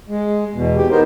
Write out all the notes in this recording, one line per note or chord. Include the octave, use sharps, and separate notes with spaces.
G#3
E2 B2
G4
B3 D#4 A#4 C5